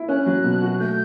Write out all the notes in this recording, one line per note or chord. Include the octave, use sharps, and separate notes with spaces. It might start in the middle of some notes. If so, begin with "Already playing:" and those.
Already playing: E4
C#4 F#6
F#3
B2
F#4
A3 G6